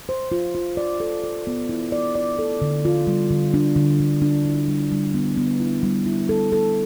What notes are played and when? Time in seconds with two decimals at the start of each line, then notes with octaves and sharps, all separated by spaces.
0.09 C5
0.32 F4
0.55 F4
0.77 D5
1.00 A4
1.24 A4
1.47 B3
1.69 E4
1.92 D5
2.15 D5
2.39 A4
2.62 D3
2.85 F4
3.07 G3
3.30 D3
3.54 D4
3.76 D3
4.00 D3
4.22 D4
4.45 E4
4.68 G3
4.91 G3
5.14 B3
5.37 B3
5.60 E4
5.83 G3
6.06 E4
6.29 A4
6.52 A4